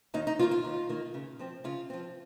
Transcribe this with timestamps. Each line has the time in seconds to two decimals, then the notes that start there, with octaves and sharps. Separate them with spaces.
0.14 D#2 D#4
0.27 D#4
0.39 D#3 F4
0.42 A#3
0.51 F4
0.65 D#2
0.89 D#3 A#3
1.14 C#3
1.39 F3 C4
1.64 C#3 F4
1.90 F3 C4